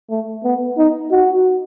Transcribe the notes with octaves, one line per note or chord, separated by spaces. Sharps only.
A3
B3
D#4
F#4